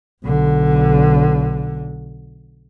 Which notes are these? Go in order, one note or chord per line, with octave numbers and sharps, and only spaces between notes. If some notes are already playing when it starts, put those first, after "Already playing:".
B1 D3